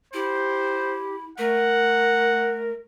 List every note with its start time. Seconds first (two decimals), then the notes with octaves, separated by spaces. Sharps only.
0.14 E4 G4 C5
1.38 A3 A#4 F#5